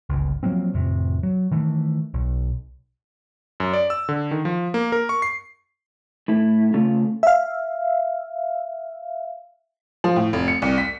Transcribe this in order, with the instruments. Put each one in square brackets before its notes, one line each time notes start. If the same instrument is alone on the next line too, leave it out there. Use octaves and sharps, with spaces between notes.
[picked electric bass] G1 C#2
F3 F#3 A#3 C4
A1 F2 C3
F#3
D#3 E3 A3
B1
[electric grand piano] F#2
D5
E6
D3
D#3
F3
A#3
A#4
C#6
C7
[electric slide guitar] A2 E4
C#3 A3 F4
[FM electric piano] E5 F5
[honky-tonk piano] F3
A2
F1
C#7
C2
B6